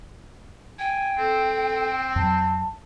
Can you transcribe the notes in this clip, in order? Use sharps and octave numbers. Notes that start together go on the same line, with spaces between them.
G5 G#5
C4 A4
F2 F#3 A5